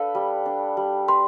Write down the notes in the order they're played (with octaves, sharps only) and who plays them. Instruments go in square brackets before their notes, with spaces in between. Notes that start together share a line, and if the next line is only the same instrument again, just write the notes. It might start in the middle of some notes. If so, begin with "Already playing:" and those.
Already playing: [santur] D4 A4 B4 [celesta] F5
[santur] G3
D4
G3
[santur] B4 [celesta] C6